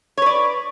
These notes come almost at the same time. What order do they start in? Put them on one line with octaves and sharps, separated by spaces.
C#5 B4 D5